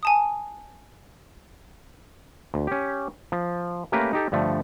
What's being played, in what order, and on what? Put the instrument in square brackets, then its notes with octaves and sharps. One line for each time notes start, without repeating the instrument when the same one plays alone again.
[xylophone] G#5 A5 D#6
[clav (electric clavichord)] D2
C#4 G4
F3
A3 A#3 C#4 G4 A#4 B4
D#4 G4 A4
G2 D3 F3 A3